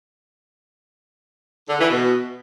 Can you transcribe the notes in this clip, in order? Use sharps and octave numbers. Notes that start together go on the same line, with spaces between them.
D3
E3
B2